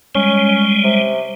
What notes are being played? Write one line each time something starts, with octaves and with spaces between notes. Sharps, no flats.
G3 G#3 C#4
C3